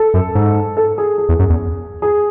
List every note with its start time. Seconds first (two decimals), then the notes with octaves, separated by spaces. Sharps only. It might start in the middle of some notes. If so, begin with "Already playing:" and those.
Already playing: A4
0.14 F#2
0.35 G#2
0.77 A4
0.98 G#4
1.18 G#4
1.29 E2
1.40 F#2
1.50 E2
2.02 G#4